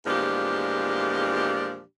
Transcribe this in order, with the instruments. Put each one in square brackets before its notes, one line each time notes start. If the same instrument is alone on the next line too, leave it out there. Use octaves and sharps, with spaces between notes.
[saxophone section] E2 A#2 F3 G#3 D4 G4